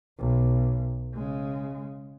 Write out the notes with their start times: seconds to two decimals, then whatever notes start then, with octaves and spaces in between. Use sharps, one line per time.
0.19 B1
1.14 C#3 G#3